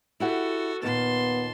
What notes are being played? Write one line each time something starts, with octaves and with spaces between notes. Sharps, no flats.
E4 F#4 G4 A4 F#5
D#2 A#2 B3 A5 C6